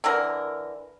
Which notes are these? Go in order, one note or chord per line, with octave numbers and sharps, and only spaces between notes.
D3 E3 A#4